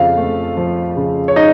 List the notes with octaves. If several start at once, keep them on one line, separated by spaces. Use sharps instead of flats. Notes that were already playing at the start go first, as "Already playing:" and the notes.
Already playing: F2 C#3 F4 F5
A3
F3
C#3
C#5
D#4 D#5